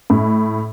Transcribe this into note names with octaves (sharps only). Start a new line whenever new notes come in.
A2